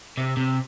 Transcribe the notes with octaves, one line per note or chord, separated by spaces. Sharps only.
C3
C3